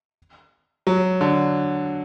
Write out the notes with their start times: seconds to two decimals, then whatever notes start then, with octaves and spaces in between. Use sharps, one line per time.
0.87 F#3
1.21 D3